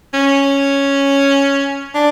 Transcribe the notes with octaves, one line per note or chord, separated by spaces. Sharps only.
C#4
D4